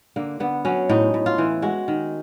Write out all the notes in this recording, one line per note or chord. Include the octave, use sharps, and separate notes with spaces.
D3 A#3
D3 B3
F#3 C#4
A2 D#4
A2
F4
E3
G#3 F#4
D#3